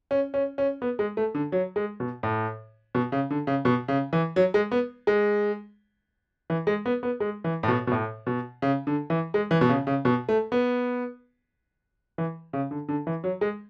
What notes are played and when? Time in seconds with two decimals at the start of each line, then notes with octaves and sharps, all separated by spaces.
0.11 C#4
0.34 C#4
0.58 C#4
0.82 B3
0.99 G#3
1.17 A3
1.34 D3
1.52 F#3
1.76 G#3
2.00 B2
2.23 A2
2.95 B2
3.12 C#3
3.30 D3
3.47 C#3
3.65 B2
3.88 C#3
4.13 E3
4.36 F#3
4.54 G#3
4.72 B3
5.07 G#3
6.50 E3
6.67 G#3
6.86 B3
7.03 B3
7.20 G#3
7.44 E3
7.63 A2
7.68 B2
7.87 B2
7.91 A2
8.27 B2
8.62 C#3
8.87 D3
9.10 E3
9.34 G#3
9.51 E3
9.61 B2
9.69 C#3
9.87 C#3
10.05 B2
10.29 A3
10.52 B3
12.18 E3
12.53 C#3
12.71 D3
12.88 D3
13.07 E3
13.24 F#3
13.41 G#3